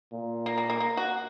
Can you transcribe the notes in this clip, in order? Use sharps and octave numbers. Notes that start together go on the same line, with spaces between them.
A#2
A#3
A#3
A#3
A#3
F#4